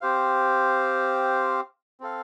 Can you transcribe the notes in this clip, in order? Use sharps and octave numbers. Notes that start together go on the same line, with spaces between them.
C4 G4 C5 F5
C4 A4 F5